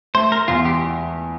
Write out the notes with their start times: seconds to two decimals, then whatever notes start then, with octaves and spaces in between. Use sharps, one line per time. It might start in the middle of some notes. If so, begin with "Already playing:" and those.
0.14 A3 C5
0.32 A#4
0.48 E2 F4
0.65 G4